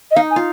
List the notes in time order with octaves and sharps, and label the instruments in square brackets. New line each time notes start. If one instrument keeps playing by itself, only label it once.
[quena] D#5
[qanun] D#4 [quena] F5
[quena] G#5
[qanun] F4